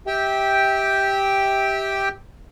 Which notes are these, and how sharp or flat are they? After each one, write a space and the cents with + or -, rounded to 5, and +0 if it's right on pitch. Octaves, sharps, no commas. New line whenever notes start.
G4 +0 E5 -25 G5 +0